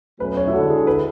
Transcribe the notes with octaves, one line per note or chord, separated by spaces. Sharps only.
B2 F#3 A3 C#4 B4
C#5
E4
D3 G#3 D4 F#4 A4
G#4
B4